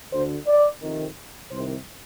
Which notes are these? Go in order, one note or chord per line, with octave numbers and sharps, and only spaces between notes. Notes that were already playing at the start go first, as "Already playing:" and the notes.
D2 D3 C5
D5
F2 C3 D#3
C2 C3 D#3 C5